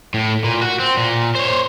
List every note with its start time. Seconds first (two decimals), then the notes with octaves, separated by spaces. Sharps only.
0.14 A2
0.44 A#2
0.61 F#4
0.79 C4
0.97 A#2
1.35 C5 C#5